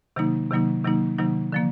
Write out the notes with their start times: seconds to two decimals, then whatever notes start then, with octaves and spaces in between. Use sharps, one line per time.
0.16 C3 D#3 F#3 A#3 D#4
0.51 C3 D#3 F#3 A#3 D#4
0.84 C3 D#3 F#3 A#3 D#4
1.18 C3 D#3 F#3 A#3 D#4
1.52 D3 F3 A#3